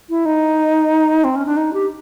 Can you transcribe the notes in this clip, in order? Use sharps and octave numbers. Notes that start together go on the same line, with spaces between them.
E4
D#4
C4
C#4
D4
D#4
G4